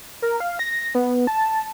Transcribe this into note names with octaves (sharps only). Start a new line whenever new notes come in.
A#4
F5
A#6
B3
A5